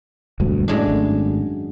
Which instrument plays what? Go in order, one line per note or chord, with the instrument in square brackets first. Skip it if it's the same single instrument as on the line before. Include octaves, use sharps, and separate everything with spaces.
[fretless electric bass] E1 D2 G2
[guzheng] F#2 G#3 D4 [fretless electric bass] A2
[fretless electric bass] G#1 A3